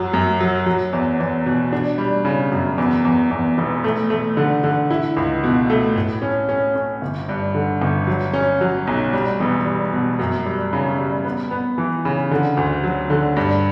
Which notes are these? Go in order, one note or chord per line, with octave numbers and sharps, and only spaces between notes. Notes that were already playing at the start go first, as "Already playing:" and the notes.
Already playing: F#2 F#3
F#2
F#3
F#3
E2
E2
B2
D4
G3
C#3
F#2
E2
E2
E2
E1
A3
A3
D3
D3
E4
C#2
B2
A3
A2
C#4
C#4
C#4
G1
G2
D3
G1
F#3
C#4
F#3
B1
G3
E1
G3
B2
F#2
G3
C#3
G3
B3
B3
E3
C#3
D3
D2
F#3
D3
G2